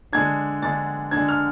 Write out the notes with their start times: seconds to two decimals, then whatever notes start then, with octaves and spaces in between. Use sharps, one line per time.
0.12 D3 G#3 D4 G#6
0.62 D3 G#3 D4 A6
1.11 D3 G#3 D4 G#6
1.29 F6